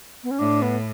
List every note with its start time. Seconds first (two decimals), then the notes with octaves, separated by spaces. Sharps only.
0.24 B3
0.31 C#4
0.39 A2 D4
0.62 B3